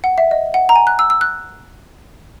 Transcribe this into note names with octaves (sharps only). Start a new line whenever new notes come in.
F#5
E5
D#5
F#5
A#5
G#5
F#6
E6
E6
F#6